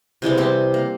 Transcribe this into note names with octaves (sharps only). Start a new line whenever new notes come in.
C3 E3 G3 G#3
G3 C4 G4
A#3